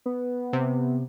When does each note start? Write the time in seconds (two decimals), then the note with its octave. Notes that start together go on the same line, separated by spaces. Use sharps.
0.06 B3
0.53 C3